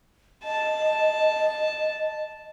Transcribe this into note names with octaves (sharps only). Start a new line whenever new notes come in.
D#5 A5